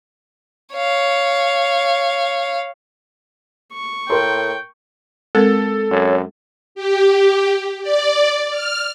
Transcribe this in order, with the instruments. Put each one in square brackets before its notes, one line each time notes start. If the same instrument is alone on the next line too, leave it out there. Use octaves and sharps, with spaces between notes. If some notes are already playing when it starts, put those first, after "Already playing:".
[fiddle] C#5 F5
[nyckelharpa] C#6
[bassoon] A2 [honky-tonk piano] A#4 C6 [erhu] G5
[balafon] G#3 C4 A#4 [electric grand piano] A4
[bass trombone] F#2 [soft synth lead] C#5
[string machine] G4
D5
F6